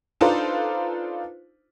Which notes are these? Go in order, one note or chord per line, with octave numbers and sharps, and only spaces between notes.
D4 D#4 F4 A4 B4 C5